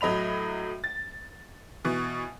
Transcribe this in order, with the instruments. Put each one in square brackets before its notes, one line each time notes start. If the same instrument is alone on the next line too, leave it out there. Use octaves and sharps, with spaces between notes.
[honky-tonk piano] A2 F#3 D#5 B5 F7
A6
B2 E3